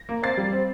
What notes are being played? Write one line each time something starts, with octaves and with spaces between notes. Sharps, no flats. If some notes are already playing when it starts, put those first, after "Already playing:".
Already playing: A#6
A#3
C4 A6 C7
G3
C4